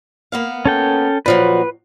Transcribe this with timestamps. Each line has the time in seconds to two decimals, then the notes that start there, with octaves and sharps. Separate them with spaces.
0.32 A#3 B3 F5
0.65 C#4 A4 G5
1.26 A#2 F3 F#3 B4